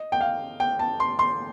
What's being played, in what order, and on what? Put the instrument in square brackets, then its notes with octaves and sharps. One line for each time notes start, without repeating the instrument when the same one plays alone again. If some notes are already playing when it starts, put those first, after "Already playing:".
Already playing: [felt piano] D#5
G5
F5
G5
A5
C6
C6